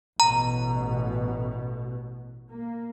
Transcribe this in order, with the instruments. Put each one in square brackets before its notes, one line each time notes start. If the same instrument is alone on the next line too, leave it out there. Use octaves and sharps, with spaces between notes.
[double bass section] A1 B2 [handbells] A#5
[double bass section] A#3